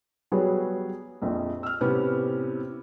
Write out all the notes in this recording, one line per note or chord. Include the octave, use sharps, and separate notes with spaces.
F#3 G3 B3 F#4 G#4 C#5
A#1 F2
E6 F6
A2 C3 B3 C#4 G4